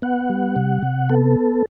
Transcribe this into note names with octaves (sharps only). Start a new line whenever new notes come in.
B3 F#5
G3
C3
C3
B3 A4